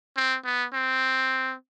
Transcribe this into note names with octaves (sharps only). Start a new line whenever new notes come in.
C4
B3
C4